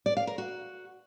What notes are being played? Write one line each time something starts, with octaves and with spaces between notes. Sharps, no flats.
D5
F5
A#4
F#4